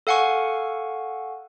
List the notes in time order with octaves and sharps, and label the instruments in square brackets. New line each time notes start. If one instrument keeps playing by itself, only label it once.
[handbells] A4 F5 F#5 G#5 C#6